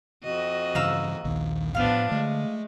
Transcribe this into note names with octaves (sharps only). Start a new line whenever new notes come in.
F2 F#4 D#5
G2 C#3 E3 F5 A#5 E6
A#1 D#2 D#3
A2 F3 B3 D4 F5 F6
D3 G#3 A3